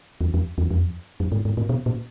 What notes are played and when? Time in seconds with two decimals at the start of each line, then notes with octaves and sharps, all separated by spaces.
0.21 E2
0.34 F2
0.58 E2
0.71 F2
1.20 F#2
1.32 G#2
1.45 G#2
1.57 A2
1.69 B2
1.86 A#2